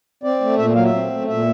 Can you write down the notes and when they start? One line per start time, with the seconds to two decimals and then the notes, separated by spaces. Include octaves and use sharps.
0.23 C4 D5
0.41 A3
0.58 A#2 E5
0.76 F#3 F5
0.84 E5
0.93 C4
1.10 A3
1.28 A#2 E5